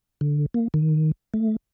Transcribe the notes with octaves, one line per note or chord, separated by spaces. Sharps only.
D3
A#3
D#3
A3